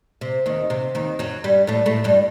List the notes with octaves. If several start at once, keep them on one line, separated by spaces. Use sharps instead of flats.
C3
D#2 D#3
C3
D#2 D#3
F#2 F#3
G2 G3
A2 A3
A2 A3
G2 G3